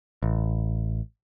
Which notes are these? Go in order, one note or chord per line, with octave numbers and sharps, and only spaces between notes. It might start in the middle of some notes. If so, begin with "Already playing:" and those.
A1